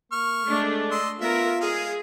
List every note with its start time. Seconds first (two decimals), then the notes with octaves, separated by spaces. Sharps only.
0.12 A#3 C#6 F6
0.47 G#3 A3 D4
0.91 D#5 C6 E6
1.21 B3 F4 A#4 E5
1.61 G#3 G#4 F5